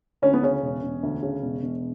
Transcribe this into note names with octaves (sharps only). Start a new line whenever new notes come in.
D2 C#4
B3
C#3 C#4
E1
E1
D2
C#3
E1
E1